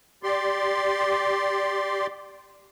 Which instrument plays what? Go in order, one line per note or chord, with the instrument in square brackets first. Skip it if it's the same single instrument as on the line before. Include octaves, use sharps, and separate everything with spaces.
[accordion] G4 D5 C6